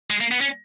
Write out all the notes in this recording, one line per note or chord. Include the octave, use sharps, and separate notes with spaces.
G#3
A#3
B3
C#4